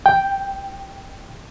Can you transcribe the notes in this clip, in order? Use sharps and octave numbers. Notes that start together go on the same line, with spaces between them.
G5